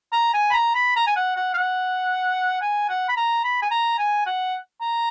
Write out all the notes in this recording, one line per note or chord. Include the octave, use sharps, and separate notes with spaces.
A#5
G#5
B5
A#5
B5
A#5
G#5
F#5
F#5
F5
F#5
G#5
F#5
B5
A#5
B5
G#5
A#5
G#5
F#5
A#5